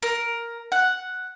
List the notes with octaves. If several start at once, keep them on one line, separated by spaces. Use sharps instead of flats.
A#4
F#5